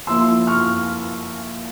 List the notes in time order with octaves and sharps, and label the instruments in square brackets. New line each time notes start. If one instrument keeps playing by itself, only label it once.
[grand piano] F3 A#3 E4 [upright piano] C6 E6
[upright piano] C#6 F6